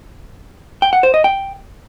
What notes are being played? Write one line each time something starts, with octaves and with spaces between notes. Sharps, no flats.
G5
F#5
C5
D#5
G5